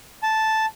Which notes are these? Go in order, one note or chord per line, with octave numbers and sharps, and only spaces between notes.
A5